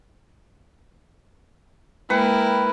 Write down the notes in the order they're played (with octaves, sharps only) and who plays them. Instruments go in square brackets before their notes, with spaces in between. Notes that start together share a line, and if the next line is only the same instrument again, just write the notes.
[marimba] G#3 A#3 [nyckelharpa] E4 A#4 [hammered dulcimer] B4 [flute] G5